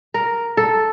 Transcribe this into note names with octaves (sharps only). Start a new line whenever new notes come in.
A#4
A4